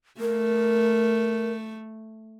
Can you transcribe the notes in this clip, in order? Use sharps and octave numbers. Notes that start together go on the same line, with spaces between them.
A3 A#4